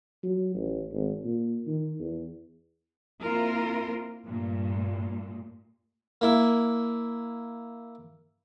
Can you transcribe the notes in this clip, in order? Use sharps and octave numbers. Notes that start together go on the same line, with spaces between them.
F#3
A1
G#1
A#2
D#3
E2
A#3 C4 E4 F4 A#4
G2 A#2 A3
A#3 E4